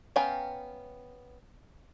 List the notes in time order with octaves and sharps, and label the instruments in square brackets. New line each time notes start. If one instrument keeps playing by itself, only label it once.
[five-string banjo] B3 C#4 F5 G5 A#5